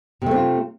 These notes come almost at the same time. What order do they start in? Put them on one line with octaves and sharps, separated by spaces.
C3 A3 C4 F4